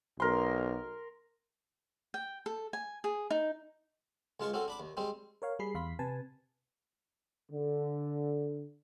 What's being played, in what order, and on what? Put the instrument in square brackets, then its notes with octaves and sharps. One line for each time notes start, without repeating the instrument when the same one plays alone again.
[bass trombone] B1 [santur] A#4 C6
[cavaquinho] G5
A4
G#5
G#4
D#4
[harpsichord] C#2 G#3 F4 A5 C#6
C4 C#4 F#4 A4
D4 B5 D6
D#2
G3 G#3 C4
[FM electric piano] A#4 C#5 F5
G3 G#4 B5 C7
E2 F5 B5 C6 B6
C3 B4 G#5 A5
[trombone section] D3